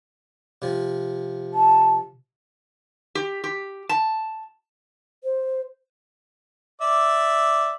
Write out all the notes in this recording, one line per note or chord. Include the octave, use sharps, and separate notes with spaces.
C3 F3
A5
G4
G4
A5
C5
D5 E5